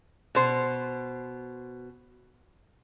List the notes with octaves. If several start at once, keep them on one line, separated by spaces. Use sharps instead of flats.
B2 C5